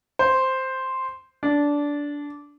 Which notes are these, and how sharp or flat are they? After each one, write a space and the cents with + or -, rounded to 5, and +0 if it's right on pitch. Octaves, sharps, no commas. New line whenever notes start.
C5 +0
D4 -15